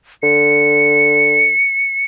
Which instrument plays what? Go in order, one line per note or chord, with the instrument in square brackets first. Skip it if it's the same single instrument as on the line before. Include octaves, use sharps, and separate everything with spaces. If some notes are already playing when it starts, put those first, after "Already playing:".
[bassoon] D3 [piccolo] C#7